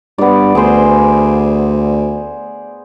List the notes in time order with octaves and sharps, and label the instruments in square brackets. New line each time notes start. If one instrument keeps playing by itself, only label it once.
[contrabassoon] G2 [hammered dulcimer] B3 D5
[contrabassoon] D2 [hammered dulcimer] G#4 C5